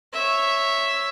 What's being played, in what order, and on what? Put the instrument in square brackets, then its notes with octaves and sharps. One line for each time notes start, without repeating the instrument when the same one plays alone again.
[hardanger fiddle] C#5 E5